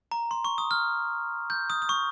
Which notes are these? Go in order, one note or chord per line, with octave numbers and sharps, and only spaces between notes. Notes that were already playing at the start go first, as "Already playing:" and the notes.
A#5
C6
C#6
D#6
F6
G6
D#6
D#6
C#6